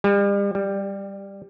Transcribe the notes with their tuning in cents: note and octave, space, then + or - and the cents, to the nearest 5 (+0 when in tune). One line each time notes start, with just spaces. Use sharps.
G3 +40
G3 +10